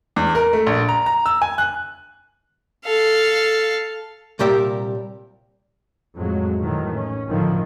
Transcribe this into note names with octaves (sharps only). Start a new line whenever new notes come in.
E2
A#4
A3
A#1
A#5
A#5
E6
G#5
F#6
A4 F5
C2 A#2 G3 G4 A#4 E5
F2 A2 F#3 G#3
A2 D#3 E3 F#3
C#4
F#1 A2 D3 D#3 F3